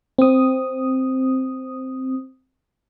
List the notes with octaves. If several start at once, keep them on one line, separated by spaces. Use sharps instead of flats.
C4 D#6